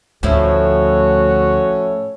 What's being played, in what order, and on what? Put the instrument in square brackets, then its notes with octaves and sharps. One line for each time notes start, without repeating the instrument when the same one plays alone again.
[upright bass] D2 [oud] A2 F3 E4 [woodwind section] C#4 A4 C#5 [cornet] F#4